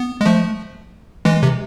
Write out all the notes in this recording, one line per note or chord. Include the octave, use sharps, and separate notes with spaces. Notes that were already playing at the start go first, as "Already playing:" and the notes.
Already playing: B3
G#3
F3 A3
E3 G#3
C3